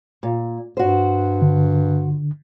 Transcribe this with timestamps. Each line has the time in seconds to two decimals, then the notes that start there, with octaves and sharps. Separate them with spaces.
0.23 A#2
0.77 G2 F#4 C5
1.42 D3